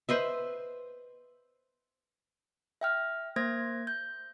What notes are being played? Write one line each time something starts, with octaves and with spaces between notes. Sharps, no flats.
B4 C5 D#5 E5
E5 G5 F6
A#3 C5 G#6 A#6
G6